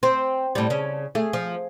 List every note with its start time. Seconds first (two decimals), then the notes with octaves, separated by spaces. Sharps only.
0.03 C4 C5
0.55 A2 G3
0.70 C#3 C#4
1.15 A3 G#4
1.33 F3